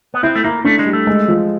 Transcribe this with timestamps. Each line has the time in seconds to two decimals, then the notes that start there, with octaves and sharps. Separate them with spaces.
0.14 B3
0.23 C4 E4
0.35 A3
0.44 A#3 E4
0.65 A3 D4
0.79 G#3
0.86 G3
0.93 A3
1.07 G#3
1.28 F3